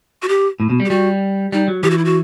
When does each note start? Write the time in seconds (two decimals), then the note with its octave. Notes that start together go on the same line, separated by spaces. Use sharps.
0.23 F#4
0.29 G4
0.60 A2
0.70 B2
0.80 G3
0.85 G4
0.90 G3 F#4
1.52 G3 D#4
1.68 F#3
1.83 E3 G4
1.90 F#4
1.98 E4
2.05 F#4